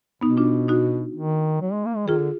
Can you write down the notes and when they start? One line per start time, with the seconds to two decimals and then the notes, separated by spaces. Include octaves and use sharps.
0.21 B2 B3 D#4
0.37 D4 F4
0.68 D#4 F#4
1.15 D#3
1.61 F#3
1.73 G#3
1.85 A#3
1.96 G#3
2.08 D#3 F4 G#4
2.19 D3